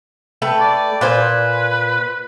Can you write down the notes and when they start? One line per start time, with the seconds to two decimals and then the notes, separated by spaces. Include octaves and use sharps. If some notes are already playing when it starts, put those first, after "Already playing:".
0.42 A3 B4 G5
0.60 D5
1.01 A#2 B4 C5 G#5